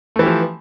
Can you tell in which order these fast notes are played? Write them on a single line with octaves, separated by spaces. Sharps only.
A3 E3 G4 F3